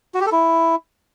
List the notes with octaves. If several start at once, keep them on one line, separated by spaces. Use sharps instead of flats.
F#4
G4
A4
E4